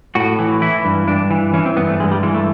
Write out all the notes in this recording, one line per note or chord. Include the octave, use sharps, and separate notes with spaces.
A2 F#4
E3
E3 E4
G2
G2 D4
E3
E3 C#4
C4
G2 B3
A3
G2 G#3
G3
E3 G#3
A3